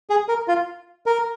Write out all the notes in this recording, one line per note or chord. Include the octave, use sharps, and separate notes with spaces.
G#4
A#4
F4
A#4